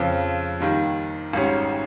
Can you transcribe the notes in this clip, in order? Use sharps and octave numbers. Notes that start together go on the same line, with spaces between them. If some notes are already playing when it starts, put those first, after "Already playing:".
Already playing: F2 C#3 F3
D#2 D#3 G3
G#1 G#2 G3 C#4